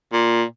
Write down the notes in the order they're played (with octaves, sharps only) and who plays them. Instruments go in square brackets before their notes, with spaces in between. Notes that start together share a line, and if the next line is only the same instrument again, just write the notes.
[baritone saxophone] A#2